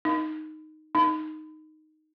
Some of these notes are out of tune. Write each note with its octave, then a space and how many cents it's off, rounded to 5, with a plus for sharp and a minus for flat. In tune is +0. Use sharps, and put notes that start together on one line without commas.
D#4 -5
D#4 -5